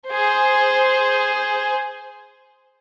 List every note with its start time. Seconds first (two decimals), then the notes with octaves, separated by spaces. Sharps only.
0.10 G#4 C5